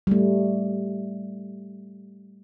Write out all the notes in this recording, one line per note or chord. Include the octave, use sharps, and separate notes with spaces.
G3 A3